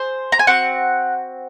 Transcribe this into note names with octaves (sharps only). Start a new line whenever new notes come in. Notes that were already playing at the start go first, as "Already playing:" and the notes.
Already playing: G#4 C5
A#5
G#5
C4 F#4 F#5